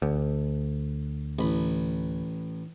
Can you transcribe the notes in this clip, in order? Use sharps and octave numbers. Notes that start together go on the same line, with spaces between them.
D2
A1 B5